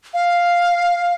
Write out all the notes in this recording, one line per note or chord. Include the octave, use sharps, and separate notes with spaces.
F5